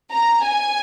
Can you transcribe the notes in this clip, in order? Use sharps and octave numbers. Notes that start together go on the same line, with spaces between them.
A#5
G#5